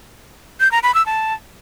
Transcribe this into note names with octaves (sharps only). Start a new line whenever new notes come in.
G6
A#5
B5
E6
A5